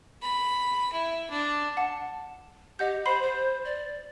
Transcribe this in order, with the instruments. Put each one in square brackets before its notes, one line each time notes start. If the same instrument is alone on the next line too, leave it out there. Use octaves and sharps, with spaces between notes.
[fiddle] B5
E4
D4
[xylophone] F#5 A5
[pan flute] G4 [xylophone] D#5 F#5 G6
[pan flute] C5 [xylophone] B5 C6 C7
[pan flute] C5
D5